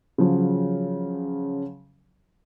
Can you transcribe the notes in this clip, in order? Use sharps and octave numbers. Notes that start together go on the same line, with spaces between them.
C#3 F3 F#3